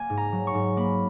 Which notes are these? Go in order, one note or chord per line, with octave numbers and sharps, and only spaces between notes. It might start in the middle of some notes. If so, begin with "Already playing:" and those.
Already playing: A#3 G#5
G#2
A#5
F#3
C#6
G#2
A#3 B5